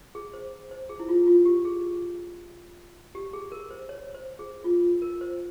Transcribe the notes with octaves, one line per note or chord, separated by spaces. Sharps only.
G#4
C5
C5
G#4
E4
F4
F4
G4
G#4
G4
G#4
A#4
C5
C#5
C5
G#4
F4
A#4
C5